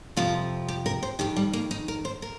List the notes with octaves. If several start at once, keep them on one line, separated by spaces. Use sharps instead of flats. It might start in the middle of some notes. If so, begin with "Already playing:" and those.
F2 C3 F3 F4
G4
A#4
C5
F2 D#3 G4
G3
A#3
D#4
A#4
C5
A#4